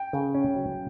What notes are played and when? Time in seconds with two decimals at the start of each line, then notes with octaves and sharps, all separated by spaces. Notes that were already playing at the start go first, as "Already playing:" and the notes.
Already playing: G5
0.13 C#3
0.35 C#4
0.56 F#3